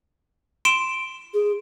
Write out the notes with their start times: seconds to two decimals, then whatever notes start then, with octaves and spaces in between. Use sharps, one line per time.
0.65 C6 D7 E7
1.34 G#4